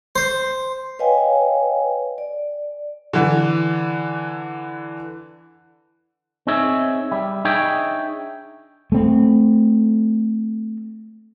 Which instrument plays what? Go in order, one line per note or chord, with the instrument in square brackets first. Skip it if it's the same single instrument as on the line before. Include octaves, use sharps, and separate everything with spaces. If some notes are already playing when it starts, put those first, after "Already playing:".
[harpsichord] C5
[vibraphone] B4 C#5 D#5 F5 G5 G#5
D5
[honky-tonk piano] D3 E3
[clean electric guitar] C4 D#4 G#4 C#5 E5
G3 E5
D4 D#4 G#4 C#5 E5 G5
[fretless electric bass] A3 C4